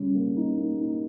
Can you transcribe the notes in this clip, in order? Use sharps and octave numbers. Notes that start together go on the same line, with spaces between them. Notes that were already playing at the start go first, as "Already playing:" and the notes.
Already playing: C#3 G3
A#3
D#4
A#3
D#4